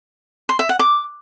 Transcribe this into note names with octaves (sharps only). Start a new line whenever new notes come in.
C6
E5
F#5
D6